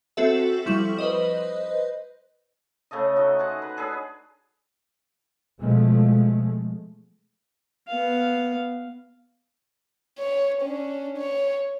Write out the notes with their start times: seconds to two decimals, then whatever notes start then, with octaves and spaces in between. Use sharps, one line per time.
0.17 C4 F#4 A4 E5
0.66 F3 G3 E4 C#6 E7 F#7
0.99 B4 C5 D#5
2.91 C#3 A3 A4 D#5
3.16 A3 D#4 F#4 D#5
3.39 G#4 C5 F#5
3.62 B4
3.77 D4 G#4 A4 B4
5.59 B2 F3 G#3 A3
7.88 B3 F5
10.19 C#5
10.61 C#4 D4
11.17 C#5